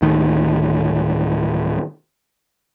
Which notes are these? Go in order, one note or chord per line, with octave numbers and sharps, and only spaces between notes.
D1 A2 D#3